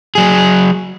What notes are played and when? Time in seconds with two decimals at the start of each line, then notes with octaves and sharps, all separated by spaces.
0.15 F#3 G#4